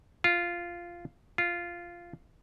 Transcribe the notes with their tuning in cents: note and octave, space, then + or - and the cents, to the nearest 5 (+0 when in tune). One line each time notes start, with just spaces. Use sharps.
F4 -10
F4 -10